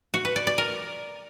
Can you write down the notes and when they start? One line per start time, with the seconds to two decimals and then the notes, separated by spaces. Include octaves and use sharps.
0.14 F#4
0.25 B4
0.36 D5
0.47 D5
0.58 A#4